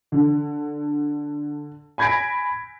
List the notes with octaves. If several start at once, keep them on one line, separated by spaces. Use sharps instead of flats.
D3
G#5 B5 G#6 A#6 B6 D7